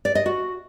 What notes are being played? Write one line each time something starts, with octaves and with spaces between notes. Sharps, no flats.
D5
D#5
F#4